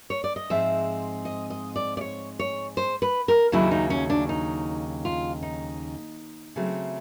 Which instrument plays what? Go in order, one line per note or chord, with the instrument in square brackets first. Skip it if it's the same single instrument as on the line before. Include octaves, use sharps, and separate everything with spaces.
[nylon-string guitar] C#5
D5
D#5
G#2 F3 G#3 C4 E5
D#5
D#5
D5
D5
C#5
C#5
C5
B4
A#4
D#2 C#3 F#3 E4
D#4
C#4
D4
D#4
F4
D#4
C#3 F#3 A3 C4